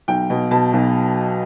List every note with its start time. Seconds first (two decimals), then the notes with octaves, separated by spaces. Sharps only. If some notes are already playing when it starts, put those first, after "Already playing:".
0.08 B1 G5
0.30 B2
0.51 B2 A5
0.73 B1